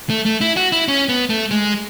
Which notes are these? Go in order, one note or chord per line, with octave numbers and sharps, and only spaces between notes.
A3
A3
E4
F#4
E4
C#4
B3
A3
G#3